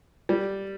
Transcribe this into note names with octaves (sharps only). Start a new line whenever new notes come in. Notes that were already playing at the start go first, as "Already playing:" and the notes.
G3